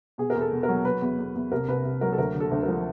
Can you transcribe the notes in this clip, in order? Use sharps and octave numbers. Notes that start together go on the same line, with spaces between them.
B2 G#4
A#4
E2
A4
B2
A#4
F#3
F#3 B4
E2
E2
E2
C2 A#4
C2 B4
C2
F#3 A#4
A4
D2 A#4
D3
A4
D2
A#4
F3